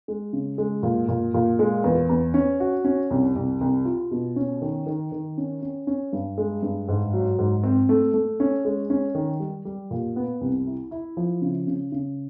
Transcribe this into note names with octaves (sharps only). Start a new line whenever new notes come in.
G#3
C#3
G#3
A#2
A#2
A#2
G#3
E2
E2
C#4
F#4
C#4
C2
C2
C2
F4
B2
C#4
D#3
D#3
D#3
C#4
C#4
C#4
G2
G#3
G2
G#2
F#3
G#2
C4
A3
A3
C#4
G#3
C#4
D#3
G3
G3
A#2
B3
C2
E4
E4
F3
C#3
C#3
C#3